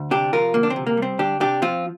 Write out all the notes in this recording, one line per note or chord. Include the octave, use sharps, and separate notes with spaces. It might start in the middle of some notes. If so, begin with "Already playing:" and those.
Already playing: D2
C3 D4 G4
F3 F4 A#4
D2 A#3
D4
C4
C3
A#3
G3
C4
D2 D4 G4
C3 D4 G4
F3 C4 F4